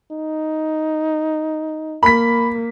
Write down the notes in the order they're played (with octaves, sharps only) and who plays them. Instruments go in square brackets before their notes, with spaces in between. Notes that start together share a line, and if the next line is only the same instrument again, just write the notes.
[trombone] D#4
[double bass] A#3 [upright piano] B5 B6